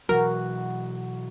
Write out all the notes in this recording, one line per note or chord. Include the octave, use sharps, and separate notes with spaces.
B2 E3 F#3 F#4 A#4